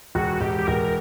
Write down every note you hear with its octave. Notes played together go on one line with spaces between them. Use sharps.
E1 F#4
E1 G4
G4
E1 A#4